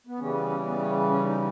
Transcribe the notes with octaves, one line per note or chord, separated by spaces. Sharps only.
B3
C#3 E3 G3 C#4
B3
C#4
B3
C#4
C#4
D#4